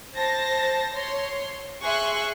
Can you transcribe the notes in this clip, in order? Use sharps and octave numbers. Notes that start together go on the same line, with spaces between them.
C5 A5 A#6
C#5 C6
G#4 E5 C6 C#6 F#6